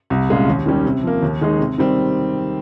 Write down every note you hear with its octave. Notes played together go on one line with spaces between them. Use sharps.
C2
A#2 G#3 C#4 F4
D#2
D#3 G3 C#4
C3
F3 A#3
D#2
D#3 G#3 D#4 G#4
C3
D#3 G3 C4